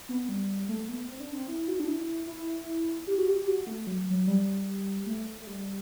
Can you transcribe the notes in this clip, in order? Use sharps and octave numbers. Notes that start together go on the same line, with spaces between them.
B3
G3
A3
B3
C4
D4
C4
E4
F#4
D4
E4
E4
G4
F#4
G4
F#4
A3
F#3
F#3
G3
A3
A3
G3